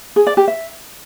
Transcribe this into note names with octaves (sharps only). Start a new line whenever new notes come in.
G#4
D5
G4
E5